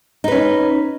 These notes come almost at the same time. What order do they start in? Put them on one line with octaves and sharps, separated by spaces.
D#4 B4 C#4